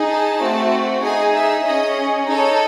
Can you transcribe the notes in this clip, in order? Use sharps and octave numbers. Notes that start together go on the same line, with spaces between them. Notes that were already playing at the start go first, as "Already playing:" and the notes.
Already playing: D#4 G#4
A5
A3 C4 F#4
D#4 G#4 G#5
E5
C#4 G#4 D#5
D#4 A4 C#5